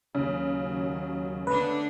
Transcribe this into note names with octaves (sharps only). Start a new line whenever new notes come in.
D#2 C#3 F#3
D3 A3 B3 D4 B4